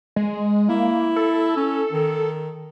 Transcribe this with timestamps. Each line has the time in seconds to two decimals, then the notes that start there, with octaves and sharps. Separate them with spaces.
0.16 G#3
0.69 A#3 E4
1.16 A4
1.57 C#4
1.92 D#3